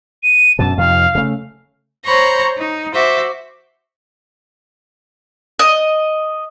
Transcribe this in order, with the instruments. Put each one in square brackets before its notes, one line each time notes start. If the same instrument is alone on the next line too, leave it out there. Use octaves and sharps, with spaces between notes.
[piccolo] D#7
[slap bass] F#2 B2 D3 [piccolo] A5
[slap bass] F2 C3 D#3 [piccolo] F5
[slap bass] C#3 A3
[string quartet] C5 C#5 A#5 B5 C#6 A#6
D#4
F#4 C5 E5 D6
[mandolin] D#5